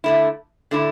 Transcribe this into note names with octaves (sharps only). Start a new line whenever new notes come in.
D3 A3 E4
D3 A3 E4